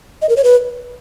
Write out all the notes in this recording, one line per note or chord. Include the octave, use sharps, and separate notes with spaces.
D#5
A#4
C#5
B4